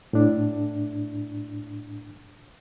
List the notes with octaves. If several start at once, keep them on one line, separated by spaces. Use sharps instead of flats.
A2 D4